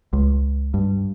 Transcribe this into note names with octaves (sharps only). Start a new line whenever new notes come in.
C#2
G2